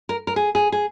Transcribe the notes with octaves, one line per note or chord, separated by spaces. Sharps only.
A#4
A#4
G#4
G#4
G#4